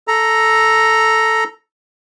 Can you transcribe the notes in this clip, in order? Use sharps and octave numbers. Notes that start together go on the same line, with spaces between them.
A4 A#5